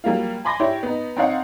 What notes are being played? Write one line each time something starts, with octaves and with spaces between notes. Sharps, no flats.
F#3 G3 A#3 F4
G#5 B5 C6 D6 A#6
D4 E4 G4 C#5
B3 D#4
C4 D4 D#4 C#5 F5 F#5